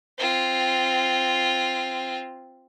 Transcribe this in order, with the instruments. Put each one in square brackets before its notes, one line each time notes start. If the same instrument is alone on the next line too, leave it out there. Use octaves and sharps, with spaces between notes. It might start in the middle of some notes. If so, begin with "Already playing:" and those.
[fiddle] C4 F4